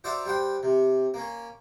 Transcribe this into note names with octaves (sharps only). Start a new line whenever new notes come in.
F#4 C5 D5 E5 F#5 A#5
G3 C5 F#5 G5
C3
A#3 C#4